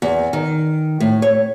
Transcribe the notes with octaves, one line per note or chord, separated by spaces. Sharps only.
E2
D#3
A2
C#5